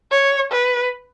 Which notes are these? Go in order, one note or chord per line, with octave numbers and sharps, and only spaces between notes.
C#5
B4